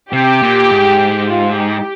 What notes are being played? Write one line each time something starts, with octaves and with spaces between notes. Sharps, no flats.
C3 G4
A#2
G#2
F4
G4